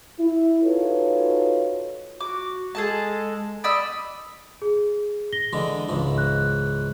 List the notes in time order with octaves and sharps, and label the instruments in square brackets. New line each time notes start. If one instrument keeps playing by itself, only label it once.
[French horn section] E4
D#4 F4 F#4 A4 B4 C#5
[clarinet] F#4 [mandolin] D6
[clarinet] G#3 [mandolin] G#4 A4 A5
[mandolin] D5 D#5 E6 [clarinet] B5
[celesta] G#4
A#6 G7
[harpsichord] D3 E3 G#3
C#2 G#2 E3
[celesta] F#6